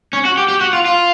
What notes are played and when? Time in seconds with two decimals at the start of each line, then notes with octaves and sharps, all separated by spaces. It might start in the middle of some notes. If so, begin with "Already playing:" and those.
0.13 C#4
0.25 F#4
0.37 G4
0.49 G4
0.61 F#4
0.73 F4
0.86 F4